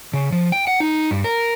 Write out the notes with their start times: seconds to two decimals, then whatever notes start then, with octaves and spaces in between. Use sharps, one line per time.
0.14 C#3
0.32 F3
0.52 G5
0.67 F#5
0.80 D#4
1.11 G2
1.24 A#4